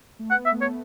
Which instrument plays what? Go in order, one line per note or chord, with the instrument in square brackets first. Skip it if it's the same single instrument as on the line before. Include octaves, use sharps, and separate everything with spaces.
[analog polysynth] A3
[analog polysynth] B3 [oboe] F#5
[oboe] E5
[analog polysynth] A3
[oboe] C#5